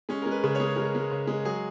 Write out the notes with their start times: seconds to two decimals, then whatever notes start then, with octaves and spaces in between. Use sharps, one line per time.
0.09 G#3 C#4
0.22 G#3 A#4
0.31 B4
0.43 C#3
0.55 G#3 C#5
0.77 G#3 A#4
0.95 G#3
1.11 C#3
1.27 G#3
1.45 F#3 G#4